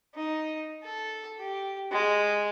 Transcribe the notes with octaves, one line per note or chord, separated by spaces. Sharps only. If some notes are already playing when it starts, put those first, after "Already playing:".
D#4
A4
G4
G#3